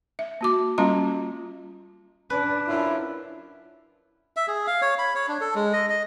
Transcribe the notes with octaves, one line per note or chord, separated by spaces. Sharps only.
E5
A#3 F#4 D6
G3 A#3 C#4 F4 D#5 A#5
D4 B4
F#2 C#4 E4 F4
E5
G#4
F5
C#5
B5
C#5
D4
A4
G#3
D#5
D#5